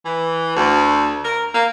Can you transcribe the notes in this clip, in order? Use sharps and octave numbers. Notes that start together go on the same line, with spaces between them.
E3
D2
A#4
A#3